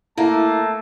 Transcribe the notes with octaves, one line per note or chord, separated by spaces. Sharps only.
A3 A#3 E4 A5